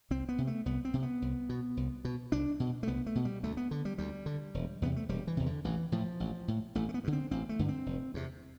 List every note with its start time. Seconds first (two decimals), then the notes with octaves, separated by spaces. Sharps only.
0.10 C2 C4
0.29 B3
0.38 C3
0.47 A3
0.66 C2 B3
0.85 C4
0.94 C3
1.03 B3
1.22 C2
1.49 B2
1.77 C2
2.05 B2
2.32 C2 D4
2.60 B2
2.83 A3
2.88 C2 B3
3.06 A3
3.15 B2
3.25 G3
3.43 D2 A3
3.57 B3
3.71 D3
3.85 G3
3.98 D2 G3
4.26 D3
4.54 E1
4.82 E2 C3 B3
4.96 A3
5.09 E1 G3
5.27 E3
5.37 E2 C3
5.46 D3
5.64 A1 E3
5.92 A2 F3
6.20 A1
6.48 A2
6.75 A1 A3
6.89 A3
6.94 B3
7.04 G2
7.07 D3
7.13 C4
7.31 A1 C4
7.49 A3
7.59 G2 D3
7.68 C4
7.86 F1
8.14 E2 C3